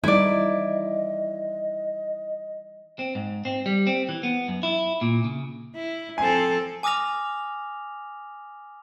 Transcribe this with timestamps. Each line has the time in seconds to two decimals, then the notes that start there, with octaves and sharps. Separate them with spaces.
0.04 E3 G3 D#4 E4 D5 D#5
2.99 C4
3.15 G#2
3.45 C4
3.66 G3
3.87 C4
4.09 E3
4.23 B3
4.48 F#2
4.63 E4
5.01 A#2
5.24 C#3
5.75 E4
6.18 F3 C4 A4 G#5
6.83 G#5 D6 D#6 F6 A#6 F7